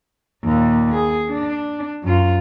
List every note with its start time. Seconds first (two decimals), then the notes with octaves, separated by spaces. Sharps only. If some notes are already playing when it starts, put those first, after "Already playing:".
0.44 D#2 A#2
0.94 G#4
1.29 D4
2.03 F#2 F4